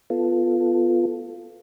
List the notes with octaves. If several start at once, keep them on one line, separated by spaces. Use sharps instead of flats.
B3 F4 A4